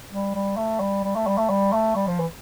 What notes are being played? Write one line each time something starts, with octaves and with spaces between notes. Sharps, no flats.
G3
G3
A3
G3
G3
A3
G3
A3
G3
A3
G3
F3
E3